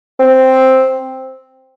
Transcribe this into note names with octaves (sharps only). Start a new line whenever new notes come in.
C4